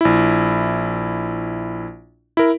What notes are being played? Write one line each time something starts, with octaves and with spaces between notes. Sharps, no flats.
A#1 E4
E4 A#4